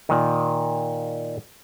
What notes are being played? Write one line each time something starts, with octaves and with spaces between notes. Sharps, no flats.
A#2 D#3